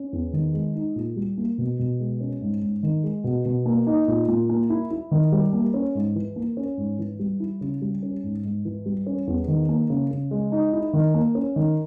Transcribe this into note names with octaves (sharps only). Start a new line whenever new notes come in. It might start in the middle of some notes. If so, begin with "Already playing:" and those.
Already playing: C#4
E2
D#3
G#3
D#4
A#2
G3
A#3
B2
B2
G#3
C#4
G#2
G#2
D#3
G#3
B2
B2
A#3
D#4
A#2
A#2
A#3
E4
E4
D#3
G3
A#3
C#4
G#2
E3
A#3
C#4
G#2
E3
G3
E4
C#3
G3
C#4
G#2
G#2
E3
G3
C#4
E2
D#3
A#3
C#3
C#3
G#3
D#4
E4
D#3
A#3
C#4
D#3